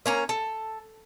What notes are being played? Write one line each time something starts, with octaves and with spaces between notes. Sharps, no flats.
A#3 C#4 A#5
A4